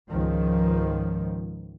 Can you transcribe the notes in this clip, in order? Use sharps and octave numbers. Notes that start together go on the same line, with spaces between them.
C#2 G#2 D#3 F3